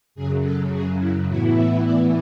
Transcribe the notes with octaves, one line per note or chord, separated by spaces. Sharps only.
F#2 C#3 F#3 G#4
A4
G#4
E4
A2 E3 B3 E4 F#4
E5
D5